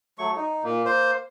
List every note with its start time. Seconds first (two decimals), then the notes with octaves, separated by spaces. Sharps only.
0.18 F#3 A3 C#6
0.36 D#4
0.64 A#2 A#3
0.86 C5